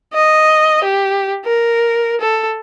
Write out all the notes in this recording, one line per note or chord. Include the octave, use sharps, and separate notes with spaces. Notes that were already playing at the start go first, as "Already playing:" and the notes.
D#5
G4
A#4
A4